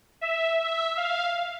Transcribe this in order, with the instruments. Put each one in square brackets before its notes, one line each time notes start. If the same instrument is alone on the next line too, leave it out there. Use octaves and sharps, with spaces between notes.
[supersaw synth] E5
E5
F5